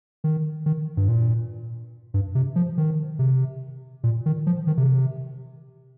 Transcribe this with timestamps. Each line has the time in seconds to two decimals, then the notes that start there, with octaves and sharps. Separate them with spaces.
0.24 D#3
0.66 D#3
0.97 G2
1.08 A#2
2.14 G2
2.35 C3
2.56 F3
2.78 D#3
3.19 C3
4.04 A#2
4.26 D#3
4.47 F3
4.67 D#3
4.77 C3